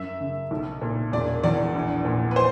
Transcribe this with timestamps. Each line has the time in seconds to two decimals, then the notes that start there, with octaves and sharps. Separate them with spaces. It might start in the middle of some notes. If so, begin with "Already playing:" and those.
Already playing: F#2 E5
0.20 C#3
0.51 B1
0.81 A#2
1.12 E1 D5
1.44 E2 D5
1.74 A#1
2.05 A#2
2.31 B4
2.36 C5